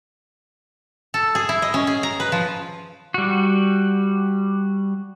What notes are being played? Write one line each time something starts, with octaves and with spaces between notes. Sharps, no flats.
A4
G#4
E4
D#5
C#4
G#4
A#5
B4
F3
G3 F#4